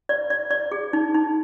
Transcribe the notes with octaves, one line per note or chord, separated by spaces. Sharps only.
D5
D5
D5
G#4
D#4
D#4